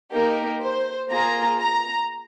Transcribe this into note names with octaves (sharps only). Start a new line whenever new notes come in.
A#3 D#4 G4 A#4
C5
A#3 F4 G#4 A#5
A#5